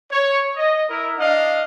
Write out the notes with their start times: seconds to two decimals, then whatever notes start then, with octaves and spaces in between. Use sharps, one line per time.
0.11 C#5
0.55 D#5
0.88 E4 A#4
1.18 D4 D#5 F5